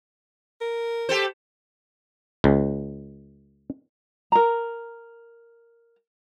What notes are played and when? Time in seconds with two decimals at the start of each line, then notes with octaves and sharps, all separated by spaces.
0.61 A#4
1.09 G4 A4 C5
2.44 C#2
4.32 A#4 A#5